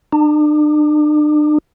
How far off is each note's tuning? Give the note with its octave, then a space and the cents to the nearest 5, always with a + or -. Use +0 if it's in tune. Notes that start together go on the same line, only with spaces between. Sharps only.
D4 +40